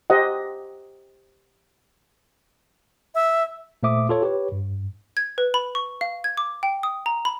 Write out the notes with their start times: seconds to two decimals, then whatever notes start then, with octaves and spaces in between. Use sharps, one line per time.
0.10 G4 C5 D#5 F#5
3.15 E5
3.83 A#2 A3 C5 E5 D6 D#6
4.09 F4 A4 C#5
4.22 G4 B4 C#5
4.52 G2
5.17 G#6
5.38 B4
5.54 B5
5.75 C#6
6.01 F5
6.24 G#6
6.37 D6
6.63 G5
6.83 D#6
7.06 A#5
7.25 B5